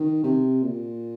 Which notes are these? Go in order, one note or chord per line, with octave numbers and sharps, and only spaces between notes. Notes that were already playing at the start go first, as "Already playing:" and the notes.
Already playing: D#3
C3
A#2